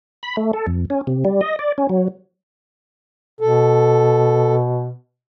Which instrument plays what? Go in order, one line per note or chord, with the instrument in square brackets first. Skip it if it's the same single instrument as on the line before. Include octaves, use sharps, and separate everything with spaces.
[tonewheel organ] B5
A3
A4
F2
C#4
C3
G3
D#5
D5
C#4
F#3
[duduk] B2 [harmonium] A4